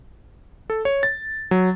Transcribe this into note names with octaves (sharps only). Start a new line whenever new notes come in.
A4
C#5
A6
F#3